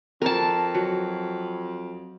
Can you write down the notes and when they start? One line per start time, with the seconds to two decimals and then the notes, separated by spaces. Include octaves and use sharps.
0.22 F2 A#4 A5
0.74 F#3